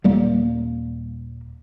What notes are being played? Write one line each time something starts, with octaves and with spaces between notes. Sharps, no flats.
D#1 G3 A#3